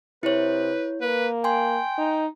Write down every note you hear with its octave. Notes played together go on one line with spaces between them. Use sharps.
C3 E4 B4 C#5
A#3 B4
G5 G#5 C6
D#4